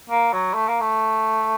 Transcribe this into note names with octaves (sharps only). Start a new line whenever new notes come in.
A#3
F#3
A3
A#3
A3